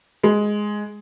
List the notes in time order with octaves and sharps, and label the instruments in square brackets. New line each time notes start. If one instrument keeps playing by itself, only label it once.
[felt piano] G#3